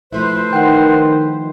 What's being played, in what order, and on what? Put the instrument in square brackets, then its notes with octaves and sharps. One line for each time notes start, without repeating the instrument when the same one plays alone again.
[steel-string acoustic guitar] F3 A3 E4 [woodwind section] B4 C5
[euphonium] D#3 [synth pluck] F#5 G5